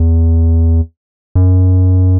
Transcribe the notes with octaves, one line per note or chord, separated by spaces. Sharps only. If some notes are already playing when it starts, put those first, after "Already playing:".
Already playing: E2
F#2